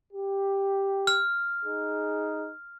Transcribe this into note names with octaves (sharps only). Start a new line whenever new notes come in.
G4
F6
D#4 G#4